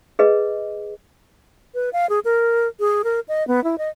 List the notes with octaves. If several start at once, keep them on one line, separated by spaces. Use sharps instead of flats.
G#4 B4 D#5
B4
F5
G#4
A#4
G#4
A#4
D#5
B3
E4
D#5